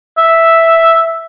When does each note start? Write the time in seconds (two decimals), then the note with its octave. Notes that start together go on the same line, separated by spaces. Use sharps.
0.18 E5